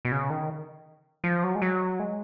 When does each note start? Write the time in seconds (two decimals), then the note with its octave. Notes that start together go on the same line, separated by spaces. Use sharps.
0.05 B2
0.12 C#3
0.30 D#3
1.24 F3
1.44 F#3
1.55 G#3
1.62 F#3
2.00 G#3